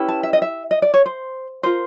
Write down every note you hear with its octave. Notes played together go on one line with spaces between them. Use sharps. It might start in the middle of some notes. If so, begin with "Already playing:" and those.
Already playing: C#4 E4 G4 B4
A5
E5
D#5
E5
D#5
D5
C#5
C5
F4 A#4 C5